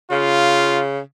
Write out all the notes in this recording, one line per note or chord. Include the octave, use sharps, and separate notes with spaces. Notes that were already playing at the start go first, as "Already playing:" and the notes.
C#3 F4